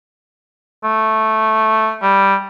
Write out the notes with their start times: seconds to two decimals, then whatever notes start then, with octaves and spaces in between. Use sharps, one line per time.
0.84 A3
2.02 G3